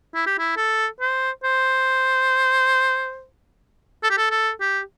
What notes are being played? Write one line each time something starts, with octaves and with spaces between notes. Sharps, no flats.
E4
G4
E4
A4
C5
C5
A4
G4
A4
A4
G4